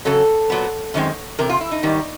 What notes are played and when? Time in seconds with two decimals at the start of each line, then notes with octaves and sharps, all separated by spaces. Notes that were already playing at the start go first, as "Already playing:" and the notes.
0.05 F#2 C#3 F#3 A4
0.50 A#2 F#3 B3
0.94 F#2 D#3 G#3 C4
1.39 E2 C3 A#4
1.49 F4
1.61 E4
1.71 D#4
1.83 G#2 D#3 G3